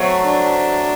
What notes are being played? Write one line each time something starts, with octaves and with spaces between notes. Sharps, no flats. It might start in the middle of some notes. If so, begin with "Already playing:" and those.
Already playing: F#3 A3 C4
D4